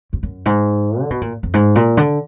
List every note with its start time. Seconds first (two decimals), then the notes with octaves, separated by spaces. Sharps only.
0.13 F2
0.23 F#2
0.46 G#2
1.01 D3
1.10 B2
1.21 A#2
1.43 F2
1.54 G#2
1.76 A#2
1.97 D3